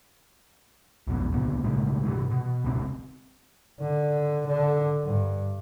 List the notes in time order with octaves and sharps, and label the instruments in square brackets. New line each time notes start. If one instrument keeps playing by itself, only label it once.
[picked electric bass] B1 F2 B2
C#2 A#2 D3 B3
A#2 C#3 G#3 A3
C3 E3 F3 G3
B2
F1 C#2 C4
[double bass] D3
D3
G2